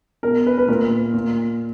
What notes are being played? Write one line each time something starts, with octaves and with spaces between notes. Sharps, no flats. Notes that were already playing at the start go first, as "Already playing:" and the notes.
B2 A#4
B4
B4
A#2 A#4
A#2